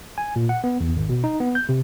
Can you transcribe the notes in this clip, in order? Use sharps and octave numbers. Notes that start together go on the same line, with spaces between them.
G#5
A#2
F#5
B3
E2
G#1
B2
D#4
B3
G6
C3